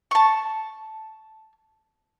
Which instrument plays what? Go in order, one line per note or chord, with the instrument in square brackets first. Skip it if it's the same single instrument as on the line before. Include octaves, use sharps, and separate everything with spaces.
[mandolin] A5 C#6